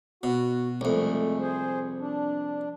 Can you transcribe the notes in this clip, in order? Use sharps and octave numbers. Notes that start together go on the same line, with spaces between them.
B2 F#4
C2 F2 G#3 A3
G#4 C5
D4